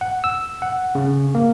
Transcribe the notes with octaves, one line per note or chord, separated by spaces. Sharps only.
F#5
E6
F#5
C#3
A#3